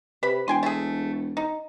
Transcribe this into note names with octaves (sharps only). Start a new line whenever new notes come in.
C3 B4 B5
E1 G5 G#5 C6
A3 G#4
D#4